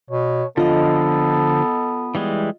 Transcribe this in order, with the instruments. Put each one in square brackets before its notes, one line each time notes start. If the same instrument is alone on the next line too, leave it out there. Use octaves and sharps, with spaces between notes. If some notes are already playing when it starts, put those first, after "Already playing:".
[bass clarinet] B2 [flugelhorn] C#5
[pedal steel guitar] D3 F3 [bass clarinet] B3 [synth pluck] F4 D#5 [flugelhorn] A4
[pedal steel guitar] E3 G3 G#3